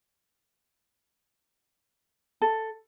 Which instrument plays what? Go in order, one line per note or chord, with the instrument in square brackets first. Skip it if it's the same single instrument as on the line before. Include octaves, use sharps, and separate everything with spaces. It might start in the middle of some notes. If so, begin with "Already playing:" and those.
[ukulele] A4